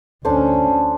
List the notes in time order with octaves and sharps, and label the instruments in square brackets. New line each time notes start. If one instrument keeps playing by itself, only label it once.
[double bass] D2 C#4 [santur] D4 A4 C5